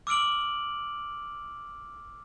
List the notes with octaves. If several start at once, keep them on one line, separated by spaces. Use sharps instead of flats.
D6 E6 F6 D7 F#7